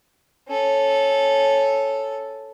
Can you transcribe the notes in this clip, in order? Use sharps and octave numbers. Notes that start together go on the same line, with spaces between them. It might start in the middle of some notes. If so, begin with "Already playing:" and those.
C#4 A4